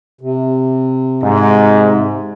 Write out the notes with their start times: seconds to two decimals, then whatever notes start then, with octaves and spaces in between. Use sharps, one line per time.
0.21 C3
1.23 G#2